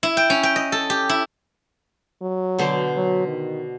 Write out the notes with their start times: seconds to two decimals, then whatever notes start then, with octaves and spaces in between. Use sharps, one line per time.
0.03 E4
0.17 G5
0.30 C#4
0.43 G5
0.56 D#5
0.72 A4
0.90 G4
1.09 E4
2.22 F#3
2.59 B2 D3 C5
2.96 F#3
3.27 D#3